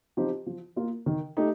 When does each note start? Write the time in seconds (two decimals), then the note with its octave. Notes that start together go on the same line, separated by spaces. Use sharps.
0.17 F3 C4 D#4 G4
0.46 F3
0.76 A#3 F4
1.06 D#3
1.37 A3 D#4 G4